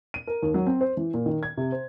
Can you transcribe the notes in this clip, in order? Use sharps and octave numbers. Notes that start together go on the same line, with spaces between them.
D#7
A#4
D#2
F#3
C4
C5
E3
A#2
D#3
G#6
C3
C5